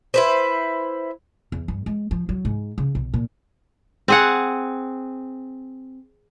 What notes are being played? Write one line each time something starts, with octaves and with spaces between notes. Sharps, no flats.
E4 B4 C5
E2
G2
G#3
F3
F#3
G#2
C#3
B1
A#2
C4 G#4 F#5